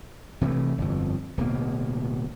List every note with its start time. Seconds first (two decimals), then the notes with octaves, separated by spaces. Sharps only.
0.41 C3 E3 F3 A3
0.78 G1 F2
1.37 D1 B2 A#3